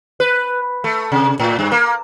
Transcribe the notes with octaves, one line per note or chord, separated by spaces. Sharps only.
B4
A3
C3
A2
G2
A#3